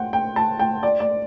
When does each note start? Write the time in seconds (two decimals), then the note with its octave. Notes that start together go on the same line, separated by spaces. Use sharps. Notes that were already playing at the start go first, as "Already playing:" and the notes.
Already playing: F#5 G5
0.13 G5
0.36 A5
0.59 G5
0.83 D5
1.00 D5